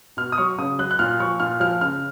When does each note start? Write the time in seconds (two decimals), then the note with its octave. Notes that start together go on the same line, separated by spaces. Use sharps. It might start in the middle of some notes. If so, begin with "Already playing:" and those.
0.17 B2 F6
0.32 D#6
0.38 F#3 C#6
0.58 C#3 D#6
0.79 F#3 F#6
0.91 F#6
0.99 A#2 F6
1.20 F3 C#6
1.40 A#2 F6
1.60 F3 F6
1.81 C#3 F6